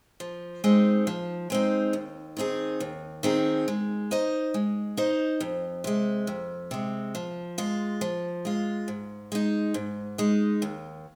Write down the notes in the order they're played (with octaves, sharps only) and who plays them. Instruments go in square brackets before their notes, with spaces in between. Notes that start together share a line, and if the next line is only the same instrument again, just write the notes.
[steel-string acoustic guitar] F3
G#3 C4 D#4
F3
G#3 C4 D#4
D#2
D#3 C4 D#4 G#4
D#2
D#3 C4 D#4 G#4
G#3
D#4 C5 D#5
G#3
D#4 C5 D#5
F2
C3 G#3
F2
C3 G#3
F3
G#3 F4
F3
G#3 F4
G#2
G#3 D#4
G#2
G#3 D#4
D#2